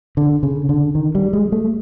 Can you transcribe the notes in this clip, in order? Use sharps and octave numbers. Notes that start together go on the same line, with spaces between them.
D3
C#3
D3
D#3
G3
G#3
A3